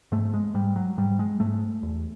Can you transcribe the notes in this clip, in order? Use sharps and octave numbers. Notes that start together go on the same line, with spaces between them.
G#2 A3
G#3
G#2 G3
F#3
G#2 G3
G#3
G#2 A3
E2